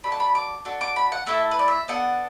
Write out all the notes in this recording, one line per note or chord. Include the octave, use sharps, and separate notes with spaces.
D4 F#4 A4 B5
A5
B5
D6
D4 F#4 A4
D6
B5
F#5
A3 E4 A4 E5
B4
D5
E5
B3 D4 A4 F#5